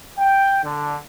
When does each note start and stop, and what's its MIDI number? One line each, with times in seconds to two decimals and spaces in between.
0.18 0.60 79
0.64 0.97 50